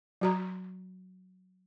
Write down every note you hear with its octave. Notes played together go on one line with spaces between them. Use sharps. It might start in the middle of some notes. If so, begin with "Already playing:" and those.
F#3 F#4 A#5